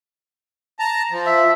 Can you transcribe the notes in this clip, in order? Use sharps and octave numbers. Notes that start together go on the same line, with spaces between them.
A5 A#5
F3
E5